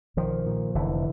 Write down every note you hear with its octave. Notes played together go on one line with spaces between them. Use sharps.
B1 D#3 F3
A#2
F1 D3 E3